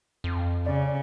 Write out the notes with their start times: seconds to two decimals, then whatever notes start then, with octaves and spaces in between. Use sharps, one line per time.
0.24 F2
0.66 C#3 D5